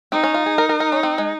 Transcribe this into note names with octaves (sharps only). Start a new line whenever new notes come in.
C4 D#4
C#4
F4
G#4
A#4
A#4
A#4
C#4
C4
G#3